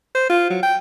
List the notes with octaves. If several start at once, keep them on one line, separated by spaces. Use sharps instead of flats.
C5
F4
F#3
G5